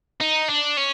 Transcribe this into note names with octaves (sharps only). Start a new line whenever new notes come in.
D#4
D4
C#4